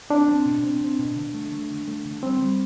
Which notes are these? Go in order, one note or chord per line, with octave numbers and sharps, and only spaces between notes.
C4 D4
C4
B2
C4
C4
B2
D3
A3
A3
D3
A3
D3
G3 C4
G3